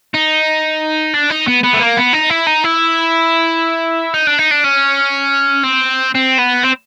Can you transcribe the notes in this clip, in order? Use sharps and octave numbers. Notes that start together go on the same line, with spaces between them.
D#4
D4
D#4
B3
B3
A3
A#3
B3
D#4
E4
D#4
E4
D#4
D4
D#4
D4
C#4
C4
C4
B3
C4